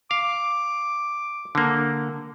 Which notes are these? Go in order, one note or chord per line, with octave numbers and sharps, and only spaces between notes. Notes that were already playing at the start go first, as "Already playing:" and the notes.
F5 D6
D3 A#3